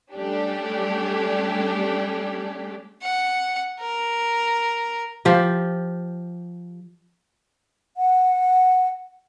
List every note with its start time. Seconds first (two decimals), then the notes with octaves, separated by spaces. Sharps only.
0.13 G3 A3 C#4 D4 G4
3.02 F#5
3.80 A#4
5.25 F3 G4
7.97 F#5